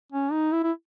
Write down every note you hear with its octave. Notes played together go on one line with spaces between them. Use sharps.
C#4
D#4
E4
E4